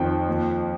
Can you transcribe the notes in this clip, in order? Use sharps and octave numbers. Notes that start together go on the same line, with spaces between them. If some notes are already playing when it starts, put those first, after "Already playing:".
Already playing: F2 D#3 G5
D#2